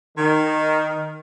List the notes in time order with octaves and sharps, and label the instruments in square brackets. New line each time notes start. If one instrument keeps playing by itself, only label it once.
[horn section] D#3